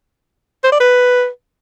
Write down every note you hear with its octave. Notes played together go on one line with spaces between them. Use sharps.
C5
D5
B4